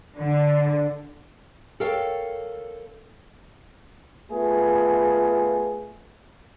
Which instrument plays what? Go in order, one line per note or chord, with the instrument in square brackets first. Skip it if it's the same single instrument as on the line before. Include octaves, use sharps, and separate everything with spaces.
[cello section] D3
[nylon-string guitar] A4 A#4 C#5 F5 G5
[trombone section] A3 B3 F4 G#4